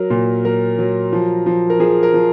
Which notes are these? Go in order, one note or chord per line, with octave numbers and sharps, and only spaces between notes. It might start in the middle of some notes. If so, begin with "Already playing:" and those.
Already playing: F#3 A#4
A#2
F#3 A#4
F#3
F3
F3
A#4
F3 G#4
A#4
F3